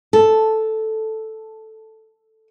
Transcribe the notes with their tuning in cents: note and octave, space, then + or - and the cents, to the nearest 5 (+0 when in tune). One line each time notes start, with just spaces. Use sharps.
A4 +0